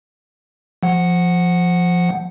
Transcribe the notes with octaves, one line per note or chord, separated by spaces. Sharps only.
F3 F#5